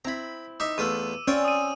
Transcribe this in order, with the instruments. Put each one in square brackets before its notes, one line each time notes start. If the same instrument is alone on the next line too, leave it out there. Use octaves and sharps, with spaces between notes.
[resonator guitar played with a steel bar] C4 E4 [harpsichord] A#5 B5
[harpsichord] D#4 E5 [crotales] D6
[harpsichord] E2 A3 F4 [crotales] E6 D#7
[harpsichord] C4 F4 C#5 [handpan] C#4 [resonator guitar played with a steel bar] D5
[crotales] D#6 D#7